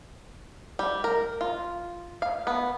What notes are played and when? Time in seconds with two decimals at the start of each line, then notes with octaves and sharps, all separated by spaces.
0.79 G3
1.04 A#4
1.41 F4
2.22 F5
2.47 B3